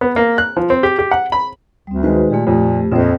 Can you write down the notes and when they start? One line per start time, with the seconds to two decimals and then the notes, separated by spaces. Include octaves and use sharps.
0.01 B3
0.16 A#3
0.38 F#6
0.57 F3
0.70 C4
0.83 G4
0.99 G4
1.11 F#5
1.32 B5
1.87 D2 G3 C4
2.03 D#3 G#3 F#4 B4 C5
2.30 A#2 A3 G4
2.47 F2 A#2
2.92 A#1 F2 C4 C5